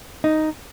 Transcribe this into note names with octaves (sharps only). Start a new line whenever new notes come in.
D#4